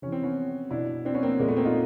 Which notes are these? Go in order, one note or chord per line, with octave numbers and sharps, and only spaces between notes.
C3 E3 C#4
C4
B3 C#4
B2 D4 E4
C4 D4
B3 C#4
A#3 C4
A#2 G#3 A#3
A3 B3
A#3 C4
D#4 F4